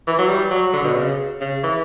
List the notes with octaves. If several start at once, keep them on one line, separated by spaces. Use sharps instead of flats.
E3
F#3
G3
F#3
D3
B2
C#3
C#3
E3